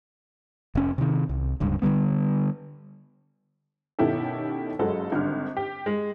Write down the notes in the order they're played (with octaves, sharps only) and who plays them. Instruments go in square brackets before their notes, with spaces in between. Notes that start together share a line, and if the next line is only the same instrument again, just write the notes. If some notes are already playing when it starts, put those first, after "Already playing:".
[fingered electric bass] F1 C#4
C3 D#3
C2
D1 C#2 G2
D3 F3 G3 B3
[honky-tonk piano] B2 D#3 C#4 E4 G4 A4
F#1 F#3 G#3 F#4 A4
G#1 D3 G3 F6
G4
G#3